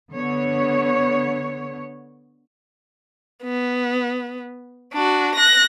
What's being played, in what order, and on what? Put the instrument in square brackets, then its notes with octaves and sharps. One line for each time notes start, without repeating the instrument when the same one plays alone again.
[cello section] D3 B3 C#5
[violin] B3
D4 F#4
F#6 A#6